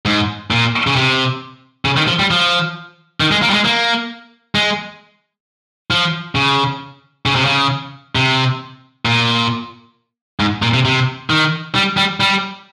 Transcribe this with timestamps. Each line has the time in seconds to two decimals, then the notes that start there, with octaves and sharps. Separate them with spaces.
0.05 G#2
0.51 A#2
0.87 C#3
0.96 C3
1.85 C#3
1.97 D#3
2.08 F3
2.19 G3
2.31 F3
3.20 D#3
3.31 G#3
3.43 A#3
3.50 G3
3.54 G#3
3.65 A#3
4.55 G#3
5.91 F3
6.35 C#3
7.26 C#3
7.35 C3
7.45 C#3
8.15 C3
9.05 A#2
10.40 G#2
10.62 A#2
10.74 C3
10.85 C3
11.30 D#3
11.75 G3
11.97 G3
12.20 G3